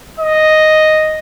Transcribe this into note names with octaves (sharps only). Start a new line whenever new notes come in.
D#5